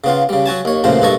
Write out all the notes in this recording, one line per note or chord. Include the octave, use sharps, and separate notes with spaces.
C#3 B3 F4
C#3 G3
F#3 F#4 G#5 A5
D#2 C#5
A1 E2 A#2 C#3 F3 C5
A#1 G2 A4 D#5 C#6